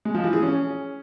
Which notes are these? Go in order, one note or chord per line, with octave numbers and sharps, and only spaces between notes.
G#3
F3
E3
G#4
C#4